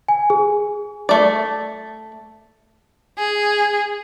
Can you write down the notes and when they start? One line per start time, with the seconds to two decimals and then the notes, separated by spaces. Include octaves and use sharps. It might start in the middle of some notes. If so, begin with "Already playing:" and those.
0.08 G#5
0.30 G#4
1.09 A3 D5
3.18 G#4